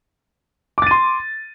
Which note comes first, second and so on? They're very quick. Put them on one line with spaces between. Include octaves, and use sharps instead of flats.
D6 A6 D#7 C6